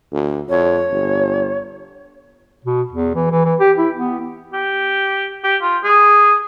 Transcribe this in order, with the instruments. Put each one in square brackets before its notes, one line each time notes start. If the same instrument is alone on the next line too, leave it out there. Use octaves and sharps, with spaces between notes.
[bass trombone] D2
[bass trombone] F2 [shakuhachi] C#5
[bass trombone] G1
[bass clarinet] B2
E2
E3
E3
E3
G4
E4
B3
[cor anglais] G4
G4
F4
G#4